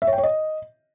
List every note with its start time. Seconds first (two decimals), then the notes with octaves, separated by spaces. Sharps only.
0.02 E5
0.07 C#5
0.13 G5
0.18 C#5
0.23 D#5